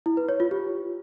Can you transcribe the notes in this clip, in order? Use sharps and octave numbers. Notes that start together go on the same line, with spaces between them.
E4
B4
C#5
F4
G4